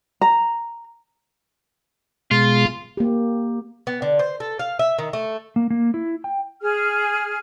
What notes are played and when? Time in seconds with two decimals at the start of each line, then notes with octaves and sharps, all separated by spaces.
0.21 A#5
2.31 B2 G#3 F4
2.97 A#3 G4
3.87 B3
4.02 D3
4.19 C5
4.40 A4
4.59 F5
4.79 E5
4.98 D#3
5.13 A3
5.56 A#3
5.70 A#3
5.94 E4
6.24 G5
6.62 G#4 F6